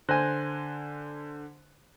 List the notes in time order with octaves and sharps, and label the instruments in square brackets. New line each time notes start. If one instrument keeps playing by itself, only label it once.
[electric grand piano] D3 F#6 A#6 [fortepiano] C5 G#5